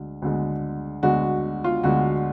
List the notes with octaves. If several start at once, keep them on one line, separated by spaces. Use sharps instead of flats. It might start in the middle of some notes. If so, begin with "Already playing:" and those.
Already playing: D2 D3 G#3
D2 D3 G#3
D2 D3 G#3 F#4
F4
D2 D3 G#3 F#4